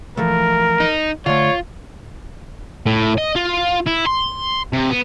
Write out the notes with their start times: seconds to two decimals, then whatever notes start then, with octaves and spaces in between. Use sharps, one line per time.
0.17 E3 F3 A3 A#4
0.80 D#4
1.26 D3 A3 F4 C#5
2.86 A2
3.18 D#5
3.35 F4
3.86 E4
4.06 C6
4.73 C3
4.90 B3